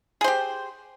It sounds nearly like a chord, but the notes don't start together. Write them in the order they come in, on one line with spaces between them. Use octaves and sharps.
G#4 C5 G4